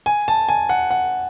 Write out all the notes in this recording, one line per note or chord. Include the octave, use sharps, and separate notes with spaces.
G#5
A5
G#5
F#5
F#5